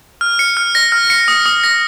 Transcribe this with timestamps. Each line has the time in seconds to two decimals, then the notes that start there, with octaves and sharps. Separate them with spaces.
0.21 F6
0.39 C#7
0.57 F6
0.75 A#6
0.92 F6
1.10 C#7
1.28 D#6
1.46 D#6
1.64 A#6